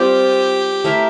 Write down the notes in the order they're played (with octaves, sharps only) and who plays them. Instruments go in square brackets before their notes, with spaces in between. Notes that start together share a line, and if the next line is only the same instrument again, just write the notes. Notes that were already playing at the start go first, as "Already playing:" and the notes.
Already playing: [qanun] G3 C4 F4 C5 [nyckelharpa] G4
[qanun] A3 E4 A#4 E5